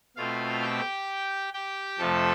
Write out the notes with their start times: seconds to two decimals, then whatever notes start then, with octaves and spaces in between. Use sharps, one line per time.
0.17 B2 A3 C4 F4 F5
0.62 G4 G5
1.53 G4 G5
1.98 F2 C3 F3 A3 A4 A5